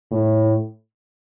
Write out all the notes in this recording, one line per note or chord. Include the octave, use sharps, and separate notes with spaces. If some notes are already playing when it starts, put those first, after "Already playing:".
A2